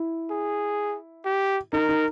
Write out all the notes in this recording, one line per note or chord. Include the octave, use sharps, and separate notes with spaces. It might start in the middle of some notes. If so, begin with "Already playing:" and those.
Already playing: E4
G#4
G4
D#4 A#4
D#4